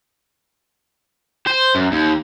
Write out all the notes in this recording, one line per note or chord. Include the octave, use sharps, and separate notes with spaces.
C5
F#2
D#2